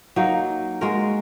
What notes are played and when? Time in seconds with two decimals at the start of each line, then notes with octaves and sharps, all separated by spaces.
0.16 F#3 A#3 D#4
0.81 G#3 F#4 A#4